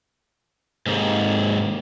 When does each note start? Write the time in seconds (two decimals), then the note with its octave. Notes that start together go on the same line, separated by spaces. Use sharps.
0.86 D#2 G#2